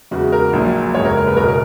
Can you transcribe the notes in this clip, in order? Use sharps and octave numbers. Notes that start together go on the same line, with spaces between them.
E2 C#3 G#3 F#4
A#4
A#1 A#2 F#3
F#1 E2 C#3 G#3 C#5
A#4
A#4
B4
F#1 E2 B2 A#4
A#4